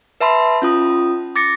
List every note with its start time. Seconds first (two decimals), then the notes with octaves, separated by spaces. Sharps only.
0.21 B4 E5 A5 B5 C6
0.62 C#4 F4 D#6
1.36 D6 A6 A#6 C#7